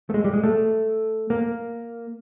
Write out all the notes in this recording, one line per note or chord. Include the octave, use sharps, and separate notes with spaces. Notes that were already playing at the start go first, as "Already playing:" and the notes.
A3
G#3
G3
G#3
A3
A#3